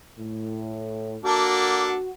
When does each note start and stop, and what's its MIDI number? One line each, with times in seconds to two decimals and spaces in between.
0.19 1.18 45
1.24 1.94 58
1.24 1.94 62
1.24 2.11 66
1.24 1.94 69